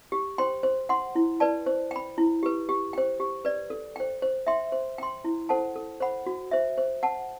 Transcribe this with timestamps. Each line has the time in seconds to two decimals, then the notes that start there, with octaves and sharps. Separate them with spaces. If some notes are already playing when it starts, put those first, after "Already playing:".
0.12 G4
0.38 C5 G5 C6
0.63 C5
0.89 F#5 C6
1.15 E4
1.40 B4 D5 A5
1.66 C5
1.91 G5 B5
2.18 E4
2.43 G4 B4
2.69 G4
2.93 C5 G5
3.20 G4
3.45 B4 D5
3.70 A4
3.96 C5 G5
4.22 C5
4.47 E5 G5 C6
4.72 C5
4.98 G5 C6
5.24 E4
5.49 A4 C5 F#5 A5
5.76 A4
6.00 C5 F#5 B5
6.26 F#4
6.51 C5 E5
6.78 C5
7.03 F#5 A5